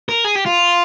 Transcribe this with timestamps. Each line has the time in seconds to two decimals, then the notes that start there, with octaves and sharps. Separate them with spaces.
0.09 A#4
0.24 G#4
0.35 G4
0.46 F4